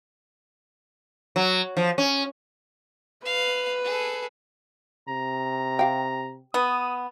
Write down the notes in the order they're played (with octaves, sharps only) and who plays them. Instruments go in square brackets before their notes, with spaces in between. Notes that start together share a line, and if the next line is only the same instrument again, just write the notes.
[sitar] F#3
F3
C#4
[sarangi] B4 [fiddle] F5
[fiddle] G#4 A4
[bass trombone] C3 [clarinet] A#5
[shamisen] G4 F5 G5
[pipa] B3 [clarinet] D#6